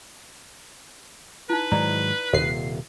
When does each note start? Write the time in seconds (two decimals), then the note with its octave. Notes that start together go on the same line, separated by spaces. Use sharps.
1.50 D#4 E4 B4
1.71 G#2 D#3 F#3 D5 A#5
2.33 D#1 D#2 C3 C7